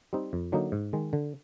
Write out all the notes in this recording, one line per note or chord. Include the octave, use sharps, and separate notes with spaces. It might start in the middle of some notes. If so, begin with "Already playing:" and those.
G3 C4 D#4
F2
D3 F#3 A#3 D#4
G#2
D#3 G#3
D3